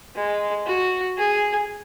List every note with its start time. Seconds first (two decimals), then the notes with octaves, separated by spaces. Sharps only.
0.15 G#3
0.66 F#4
1.18 G#4